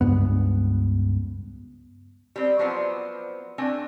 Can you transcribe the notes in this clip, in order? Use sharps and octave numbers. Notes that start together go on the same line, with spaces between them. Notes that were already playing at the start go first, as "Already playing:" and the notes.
C#2 G2 B3
G3 C4
F3 F#3 B3 C4 C5 D5
A3 C4 D4 G#5